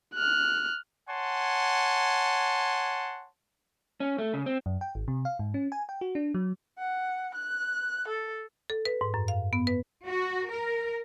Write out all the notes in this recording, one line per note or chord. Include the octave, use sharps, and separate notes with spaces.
F6 F#6
C#5 F#5 G#5 A5 C6
C#4
A3
C#3
C4
F#2
G5
G#1
C3
F5
G#2
C#4
G#5
G5
F#4
D4
F#3
F#5
F#6
A4
A4
B4
G#2
F#2
F5
B3
B4
F#4
A#4